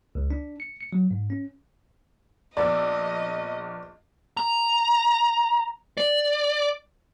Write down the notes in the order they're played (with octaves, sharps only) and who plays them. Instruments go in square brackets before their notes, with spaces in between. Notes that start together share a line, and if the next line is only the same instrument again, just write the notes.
[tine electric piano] C#2
D4
C#7
C#7
F#3
G#2
C#4
[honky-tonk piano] A#1 B3 E6 [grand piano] D5 [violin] D#5
[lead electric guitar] A#5
D5